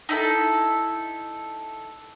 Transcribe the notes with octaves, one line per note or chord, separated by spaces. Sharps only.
D#4 E4 A4